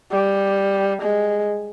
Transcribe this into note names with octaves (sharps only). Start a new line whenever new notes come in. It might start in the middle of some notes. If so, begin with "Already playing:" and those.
G3
G#3